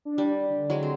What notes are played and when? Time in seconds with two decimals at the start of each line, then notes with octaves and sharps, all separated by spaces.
0.05 D4
0.18 G3
0.49 D3
0.70 F#3 G#3
0.83 C4